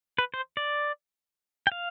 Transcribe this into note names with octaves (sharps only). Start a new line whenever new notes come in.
B4
C5
D5
G5
F5